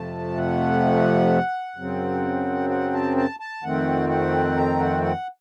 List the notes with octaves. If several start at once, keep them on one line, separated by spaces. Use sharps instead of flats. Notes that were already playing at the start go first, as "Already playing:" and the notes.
Already playing: F2 C3 F3 A3 A5
F#5
F#2 C#3 F#3 C4
F#5
A5
A5
A5
F2 D#3 A3 C4 F#5
F#5
A#5
F#5
F#5